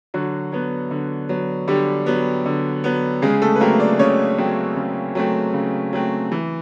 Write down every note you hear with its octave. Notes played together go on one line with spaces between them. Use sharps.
D3 F#3 F#4
F#3 B3
D3
F#3 B3
D3 G3 G4
F#3 B3
D3
F#3 B3
C#3 G#3 G#4
A3 A4
B4
F#3 A3 A#3 C4 A#4
D4 D5
C#3 C#4 C#5
F#3 A3 C4
C#3
F#3 A3 C4
C#3
F#3 A3 C4
E3